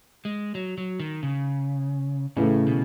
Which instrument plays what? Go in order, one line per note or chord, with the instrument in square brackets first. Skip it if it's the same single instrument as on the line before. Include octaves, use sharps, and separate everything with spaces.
[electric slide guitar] G#3
F#3
F#3
D#3
C#3
[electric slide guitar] A2 [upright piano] C#3 E3 A3
[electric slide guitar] B2